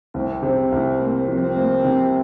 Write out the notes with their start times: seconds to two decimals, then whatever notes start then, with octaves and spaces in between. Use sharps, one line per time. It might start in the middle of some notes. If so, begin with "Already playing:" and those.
0.14 C2 C4
0.43 C3 C4
0.72 C2
1.00 A#3
1.28 F3 C4
1.56 A#3
1.84 C3